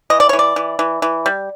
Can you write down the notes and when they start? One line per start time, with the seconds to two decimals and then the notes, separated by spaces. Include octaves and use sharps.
0.10 E3 D#5
0.20 D5
0.29 E3 C#5
0.39 D5
0.56 E3
0.79 E3
1.02 E3
1.26 G3